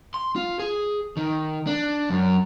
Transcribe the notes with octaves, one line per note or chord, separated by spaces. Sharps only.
C6
F4
G#4
D#3
D4
F#2